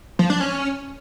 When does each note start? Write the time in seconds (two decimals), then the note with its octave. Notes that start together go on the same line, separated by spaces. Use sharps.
0.19 F3
0.30 D4
0.40 C#4